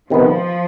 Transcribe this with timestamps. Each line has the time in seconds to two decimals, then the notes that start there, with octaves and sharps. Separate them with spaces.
0.10 C3 D#3 F3 B3